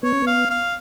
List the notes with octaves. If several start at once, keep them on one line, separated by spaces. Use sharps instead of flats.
B3 C#5
C#4
B3 F5
F5